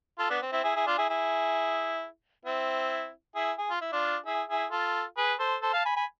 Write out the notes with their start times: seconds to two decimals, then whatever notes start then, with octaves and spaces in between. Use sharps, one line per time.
0.19 F4 A4
0.30 B3 D4
0.42 C4
0.52 C4 E4
0.64 E4 G#4
0.75 E4 G#4
0.86 D4 F4
0.98 E4 G#4
1.10 E4 G#4
2.45 C4 E4
3.36 E4 G#4
3.58 G#4
3.70 F4
3.81 E4
3.92 D4 F4
4.26 E4 G#4
4.49 E4 G#4
4.72 F4 A4
5.17 G#4 B4
5.39 A4 C5
5.62 A4 C5
5.73 F5 A5
5.85 G#5 B5
5.96 G#5 B5